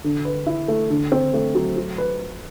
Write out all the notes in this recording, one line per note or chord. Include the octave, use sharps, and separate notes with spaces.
D3
B4
E4
A3
D3
C4
A3
F#3
F#3
B4